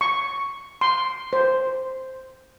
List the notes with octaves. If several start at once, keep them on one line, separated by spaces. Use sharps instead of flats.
C#6
C6
C5